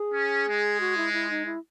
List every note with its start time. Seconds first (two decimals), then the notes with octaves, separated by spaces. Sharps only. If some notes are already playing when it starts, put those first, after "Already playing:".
Already playing: G#4
0.14 C#4
0.47 G#3
0.80 F#4
0.97 E4
1.13 E4
1.30 D#4
1.46 E4